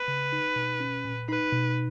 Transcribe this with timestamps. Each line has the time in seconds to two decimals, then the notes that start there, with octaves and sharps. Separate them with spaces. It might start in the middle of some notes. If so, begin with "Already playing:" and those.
Already playing: B4
0.08 C#3
0.32 D#4
0.56 B2
0.80 C#4
1.05 A#2
1.29 D#4 B4
1.53 B2